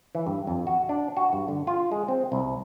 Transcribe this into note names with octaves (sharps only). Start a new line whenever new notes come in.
E3
G2
F2
F#4
D4
F#4
G2
D3
F4
G#3
C4
C2